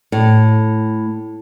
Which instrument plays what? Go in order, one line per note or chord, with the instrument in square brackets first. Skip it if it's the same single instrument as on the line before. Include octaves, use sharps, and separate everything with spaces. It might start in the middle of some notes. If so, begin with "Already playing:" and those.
[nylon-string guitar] A2